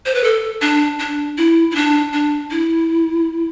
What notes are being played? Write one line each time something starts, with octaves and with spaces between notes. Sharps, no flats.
C5
B4
A4
D4
D4
E4
E4
D4
D4
E4